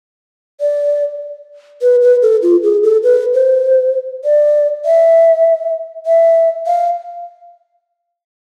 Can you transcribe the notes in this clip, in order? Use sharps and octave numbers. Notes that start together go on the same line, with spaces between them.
D5
B4
B4
A4
F4
G#4
A4
B4
C5
D5
E5
E5
F5